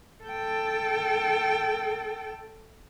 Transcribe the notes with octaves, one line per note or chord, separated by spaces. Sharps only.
A4 G5